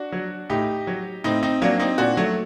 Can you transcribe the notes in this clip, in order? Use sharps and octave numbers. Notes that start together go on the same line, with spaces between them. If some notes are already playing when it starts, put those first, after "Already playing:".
Already playing: D4 F#4
F#3
A2 D#4 G4
F#3
A2 C4 D#4
C4 D#4
F#3 A#3 D4
C4 D#4
A#2 D4 F#4
F#3 A3